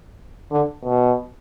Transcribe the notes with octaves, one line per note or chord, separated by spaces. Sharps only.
D3
B2